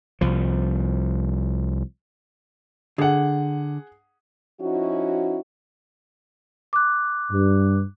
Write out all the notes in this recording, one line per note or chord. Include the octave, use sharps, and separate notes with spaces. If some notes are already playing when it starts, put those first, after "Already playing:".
C2 F3
D3 G#4 F#5
F3 C#4 D#4 E4 F#4
D6 F#6
G2